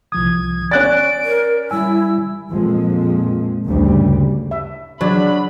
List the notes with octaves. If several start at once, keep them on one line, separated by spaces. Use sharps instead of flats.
C2 F3 D#6 G#6
C#4 C#5 D5 F#6 A6 D7
A#4
G3 E4 G#5 E6
F2 A#2 F3 G#3
D2 G2 A#2 C#3 G3
E5
F#3 D4 C5 D5 B5